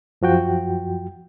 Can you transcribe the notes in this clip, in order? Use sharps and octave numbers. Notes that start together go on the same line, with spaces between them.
F#2 F3 F#4 G5